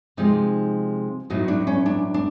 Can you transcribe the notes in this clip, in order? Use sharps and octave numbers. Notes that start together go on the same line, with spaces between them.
C3 F3 G#3 C4 D#4
A2 F#3 B3 D#4
D4
C#4
D4
D4